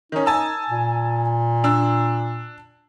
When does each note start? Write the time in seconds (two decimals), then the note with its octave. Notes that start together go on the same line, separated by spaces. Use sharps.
0.12 D#3 C#4 D#4
0.26 G#5 A5 E6
0.70 A#2
1.64 D4 E6